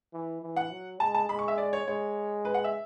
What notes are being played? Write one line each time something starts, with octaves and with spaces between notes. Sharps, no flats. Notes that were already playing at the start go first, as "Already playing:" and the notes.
E3
E3
F#5
F#3
G#3 A5
A5
G#3 B5
C#6
E5
D5
C#5
G#3 C#5
B4
F#5
E5